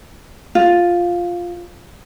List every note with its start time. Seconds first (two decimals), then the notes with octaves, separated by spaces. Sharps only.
0.55 F4